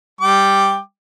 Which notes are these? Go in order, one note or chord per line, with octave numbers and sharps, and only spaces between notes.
G3 G5 D6